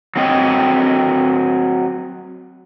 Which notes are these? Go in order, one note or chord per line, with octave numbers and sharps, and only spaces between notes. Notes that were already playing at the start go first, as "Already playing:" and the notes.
F#3 C4 D#5